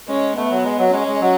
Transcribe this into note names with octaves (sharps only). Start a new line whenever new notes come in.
G#3 C#4
A3 B3
F#3
G#3
F#3
G#3 C#4
G#3
F#3